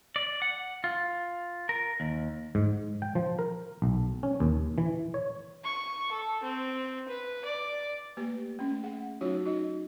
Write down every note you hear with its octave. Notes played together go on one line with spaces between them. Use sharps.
D5
F#5
F4
A#4
D#2
G#2
G5
F3
A#4
B1
C#4
D#2
E3
C#5
C#6
A4
C4
B4
D5
A3 A#3 G4 B4
A3 C#4
G#4 E5 F#5
F#3 C#4 D#4 F4 F#4 C#5
D#4 F#4 D#5